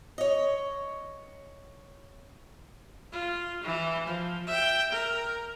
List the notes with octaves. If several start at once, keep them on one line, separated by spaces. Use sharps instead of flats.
C#5 D#5
F4
E3 E4
F3
E5 G5
A#4